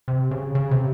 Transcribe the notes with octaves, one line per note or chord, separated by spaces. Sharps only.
C3
C#3
C#3
C3